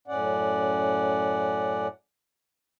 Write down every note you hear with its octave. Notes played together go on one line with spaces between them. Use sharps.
F#2 A2 C#4 D5 F#5